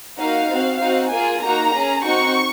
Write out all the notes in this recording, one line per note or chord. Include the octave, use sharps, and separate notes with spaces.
A#3 D#4 F#4 F5
C4 F#4
C4 D#4 F#4 F5
A#3 F4 G#4 G#5
A#3 D#4 F#4 A#5
C#4 G#4
C4 D#4 F#4 C#6